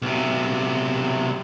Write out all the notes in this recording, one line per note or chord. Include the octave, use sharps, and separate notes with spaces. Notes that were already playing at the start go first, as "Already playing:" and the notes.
B1 C3